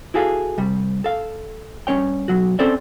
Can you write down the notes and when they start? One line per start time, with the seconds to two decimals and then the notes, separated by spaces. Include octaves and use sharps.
0.14 E4 F#4 G#4 A4 F5
0.58 C3 G3
1.04 A4 F5
1.87 G2 D#3 C#4 C#5 G5
2.28 B1 F#3 F#4
2.59 C4 C#4 A4 C5 D5 E5